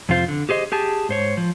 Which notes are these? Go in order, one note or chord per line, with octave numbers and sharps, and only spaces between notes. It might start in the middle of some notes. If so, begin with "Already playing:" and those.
F2 C3 F4 C5
D3
G4 G#4 C5 D#5
G4 G#4 A5
G#2 C5 C#5
F3